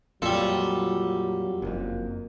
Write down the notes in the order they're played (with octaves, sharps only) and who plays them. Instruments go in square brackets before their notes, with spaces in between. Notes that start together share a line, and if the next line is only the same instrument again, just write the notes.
[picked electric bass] F2 A#2 [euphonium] F#3 [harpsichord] G3 A4 [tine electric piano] F4
[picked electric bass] F#1 F2 [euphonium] A#3